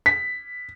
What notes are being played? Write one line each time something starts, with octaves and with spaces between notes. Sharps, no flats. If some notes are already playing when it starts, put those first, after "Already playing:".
B6